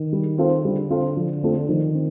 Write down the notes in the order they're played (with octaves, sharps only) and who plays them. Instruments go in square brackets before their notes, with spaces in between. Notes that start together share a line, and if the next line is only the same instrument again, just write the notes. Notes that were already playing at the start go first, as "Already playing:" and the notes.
Already playing: [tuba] D#3
[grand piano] G3
C4 F4 A4 C5
[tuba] D3 [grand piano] G3
[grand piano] C4 F4 A4 C5
F3
A3 C4 F4 A4
[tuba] D#3 [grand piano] F3
[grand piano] C4